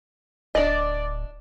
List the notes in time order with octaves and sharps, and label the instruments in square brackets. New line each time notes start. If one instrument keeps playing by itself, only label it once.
[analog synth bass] D1 [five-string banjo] D4 D#5 [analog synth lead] D5